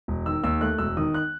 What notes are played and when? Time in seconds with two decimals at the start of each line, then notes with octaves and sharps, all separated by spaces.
0.08 E1
0.26 D#3 E6
0.44 D#2 E6
0.61 A3 F#6
0.78 E1 E6
0.97 D#3 D#6
1.14 F#6